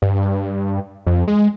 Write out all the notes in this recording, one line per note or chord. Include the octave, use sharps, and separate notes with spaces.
G2
F2
G#3